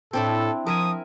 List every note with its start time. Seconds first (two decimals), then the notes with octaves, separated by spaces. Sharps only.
0.13 A2 C4 D4 E4 A4
0.67 F3 A#4 E5 G#5 D#6